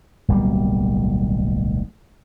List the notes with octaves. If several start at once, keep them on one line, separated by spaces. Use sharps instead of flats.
D1 B1 G3 A#3